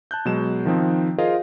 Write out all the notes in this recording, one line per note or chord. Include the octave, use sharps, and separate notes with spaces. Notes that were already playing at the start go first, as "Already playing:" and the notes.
A5 F#6 G6
B2 F#3 G#3 E7
D#3 F3 C4 D#4
F4 G#4 A#4 C5 D#5 F5